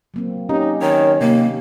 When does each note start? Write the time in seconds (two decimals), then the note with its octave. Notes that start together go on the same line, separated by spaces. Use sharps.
0.14 F#3 A#3 C4
0.49 C#4 D#4 G4
0.82 D#3 C#5
1.21 D#2 C3 A#3